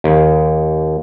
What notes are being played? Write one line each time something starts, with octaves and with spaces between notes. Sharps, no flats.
D#2